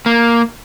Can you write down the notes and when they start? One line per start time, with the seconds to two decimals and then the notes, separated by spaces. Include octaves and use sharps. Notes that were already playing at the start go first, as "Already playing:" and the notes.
0.06 A#3